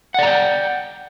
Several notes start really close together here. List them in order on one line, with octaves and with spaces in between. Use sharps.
F#5 D5 A#5 G5